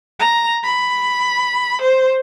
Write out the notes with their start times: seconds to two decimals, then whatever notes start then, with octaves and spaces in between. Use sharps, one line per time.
0.19 A#5
0.64 B5
1.82 C5